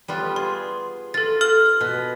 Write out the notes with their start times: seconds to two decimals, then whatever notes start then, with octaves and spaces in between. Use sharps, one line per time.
0.08 G3 B3 F4
0.36 G#4 C6
1.14 F4 A4 A6
1.41 A4 F6
1.81 B2